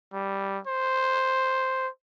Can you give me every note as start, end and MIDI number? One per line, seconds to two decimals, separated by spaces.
0.14 0.59 55
0.67 1.89 72